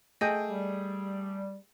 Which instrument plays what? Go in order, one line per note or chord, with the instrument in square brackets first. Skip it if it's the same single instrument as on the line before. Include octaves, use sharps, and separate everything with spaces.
[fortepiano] A3 G#4 G5 [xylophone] D#5 G#5 G6
[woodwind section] G3